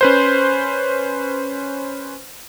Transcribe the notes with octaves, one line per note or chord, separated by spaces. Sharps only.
C#4 B4 C5